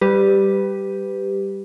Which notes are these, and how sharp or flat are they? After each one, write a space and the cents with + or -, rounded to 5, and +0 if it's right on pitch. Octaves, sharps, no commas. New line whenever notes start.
G3 +0 G4 +0 B4 +20